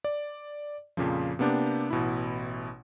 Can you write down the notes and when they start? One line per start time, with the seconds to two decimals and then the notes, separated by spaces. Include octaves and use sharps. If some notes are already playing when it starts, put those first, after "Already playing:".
0.04 D5
0.97 F2 A#2 C#3 F3
1.39 C3 A#3 B3 D4 G4
1.90 A1 B2 E4